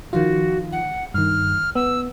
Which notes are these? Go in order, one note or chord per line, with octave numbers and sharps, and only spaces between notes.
D#3 F3 F4 F#4
F#5
G2 D#3 F6
B3 E6